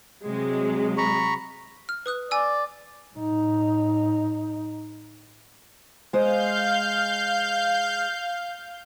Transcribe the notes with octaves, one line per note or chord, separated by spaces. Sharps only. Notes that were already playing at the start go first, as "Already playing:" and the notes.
C3 F#3 G#3
A#5 B5 C#6
F6
B4 D#6 F#6
D5 G#5 E6
A2 D#4
G#3 C5 D#5 F5 G6